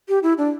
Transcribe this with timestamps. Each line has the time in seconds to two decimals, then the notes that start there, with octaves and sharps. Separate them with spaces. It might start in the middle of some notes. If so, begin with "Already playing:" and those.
0.09 G4
0.23 E4
0.38 D4